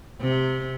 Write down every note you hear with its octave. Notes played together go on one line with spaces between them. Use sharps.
C3